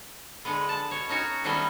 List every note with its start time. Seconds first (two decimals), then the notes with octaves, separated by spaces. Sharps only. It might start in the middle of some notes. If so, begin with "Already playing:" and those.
0.45 D3 G#3 B3
0.69 A5
0.91 B2 C#5
1.09 C#4 D#4 F#4 C#5
1.44 D#3 F#3 G3 A3 B3 C#4